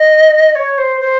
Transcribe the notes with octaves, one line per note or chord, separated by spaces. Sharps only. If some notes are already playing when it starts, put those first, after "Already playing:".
Already playing: D#5
C#5
C5
C5